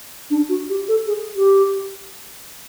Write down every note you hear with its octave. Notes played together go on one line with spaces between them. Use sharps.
D4
F#4
G4
A4
G#4
G4